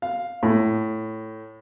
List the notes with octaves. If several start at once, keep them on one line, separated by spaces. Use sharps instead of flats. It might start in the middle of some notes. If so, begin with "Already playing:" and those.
F5
A2